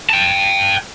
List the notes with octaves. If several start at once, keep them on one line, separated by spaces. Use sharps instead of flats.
G5 A5